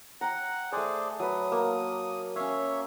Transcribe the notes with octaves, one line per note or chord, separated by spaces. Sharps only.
F#5 G5 A#5
A3 G#4 C5 D5 G#5
F#3 B4 D#6
A#3
C#4 C#5 E5 F5